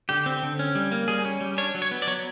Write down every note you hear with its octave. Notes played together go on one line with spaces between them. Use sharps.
D3 G4
C4
D3
C#4
G3
A#3
G3 G#4
C#4
G3
D4 C#5
F#3
C#5
B3
D5
F#3 C#5